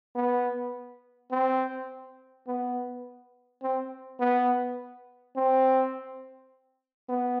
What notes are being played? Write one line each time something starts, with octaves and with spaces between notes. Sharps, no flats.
B3
C4
B3
C4
B3
C4
B3